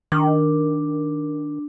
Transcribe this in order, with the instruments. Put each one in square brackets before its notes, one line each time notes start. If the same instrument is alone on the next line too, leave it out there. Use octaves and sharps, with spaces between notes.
[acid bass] D#3 [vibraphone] D4